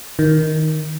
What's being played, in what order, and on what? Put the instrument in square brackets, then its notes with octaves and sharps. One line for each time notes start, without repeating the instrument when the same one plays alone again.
[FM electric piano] D#3